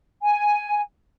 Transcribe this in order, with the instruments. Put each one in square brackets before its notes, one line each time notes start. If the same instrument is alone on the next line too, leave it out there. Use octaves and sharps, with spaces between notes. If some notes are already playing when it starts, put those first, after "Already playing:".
[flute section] G#5